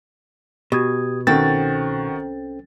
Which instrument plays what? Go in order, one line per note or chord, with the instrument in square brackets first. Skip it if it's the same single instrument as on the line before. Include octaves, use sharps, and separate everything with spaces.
[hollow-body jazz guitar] B2 [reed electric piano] G4 D#6 G#6
[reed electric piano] C2 C#4 A4 [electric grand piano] D#3 F#4 A6 [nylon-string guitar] C4